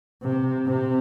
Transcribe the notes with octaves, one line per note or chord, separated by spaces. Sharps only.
C3
C3